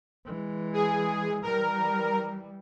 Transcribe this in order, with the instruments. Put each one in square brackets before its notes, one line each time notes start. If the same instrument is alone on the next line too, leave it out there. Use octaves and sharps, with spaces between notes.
[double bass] E3 G#3
[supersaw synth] G#4
[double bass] E3 G3 [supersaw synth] A#4